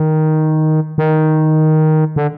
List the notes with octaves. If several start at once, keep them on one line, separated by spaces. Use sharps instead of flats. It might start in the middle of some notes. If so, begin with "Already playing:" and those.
Already playing: D#3
D#3
D3